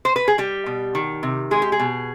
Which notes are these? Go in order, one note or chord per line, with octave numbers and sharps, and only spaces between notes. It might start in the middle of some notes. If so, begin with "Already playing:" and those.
C5
B4
G#4
G3 G4
B2
D#3
C3
G#3 G#4
G4
G#4
B2